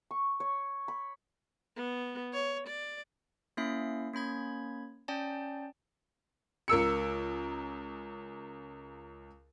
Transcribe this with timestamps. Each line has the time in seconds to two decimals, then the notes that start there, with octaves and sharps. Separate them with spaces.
0.11 C#6
0.40 C#5
0.88 B5
1.76 B3
2.33 C#5
2.67 D5
3.57 A#3 C#4 E4 E5 C7
4.14 A#3 C#4 B5 G#6
5.08 C#4 D5 G5 A5
6.68 C#2 A#4 E6 C#7